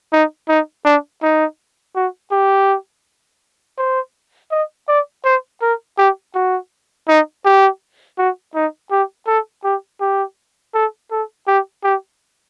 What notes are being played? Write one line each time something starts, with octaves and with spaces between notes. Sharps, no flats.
D#4
D#4
D4
D#4
F#4
G4
C5
D#5
D5
C5
A#4
G4
F#4
D#4
G4
F#4
D#4
G4
A4
G4
G4
A4
A4
G4
G4